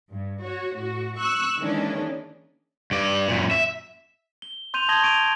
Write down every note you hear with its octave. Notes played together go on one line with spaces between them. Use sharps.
G2
F#4 C#5
A2 F#4
C#6 E6 F#6
D#3 E3 G#3 A#3 C#4 D4
G2 D5
F#2 A#2
E5
G7
C6 G6 D#7 F7
A5 D#6 G#6 A#6 F#7 G7
C#6 D7 D#7 F7